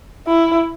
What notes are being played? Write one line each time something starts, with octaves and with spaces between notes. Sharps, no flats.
E4